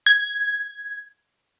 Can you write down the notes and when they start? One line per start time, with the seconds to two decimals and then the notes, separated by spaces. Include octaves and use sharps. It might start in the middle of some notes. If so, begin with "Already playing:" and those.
0.06 G#6